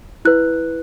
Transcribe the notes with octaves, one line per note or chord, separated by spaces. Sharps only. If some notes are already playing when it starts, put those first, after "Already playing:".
E4 B4 F#6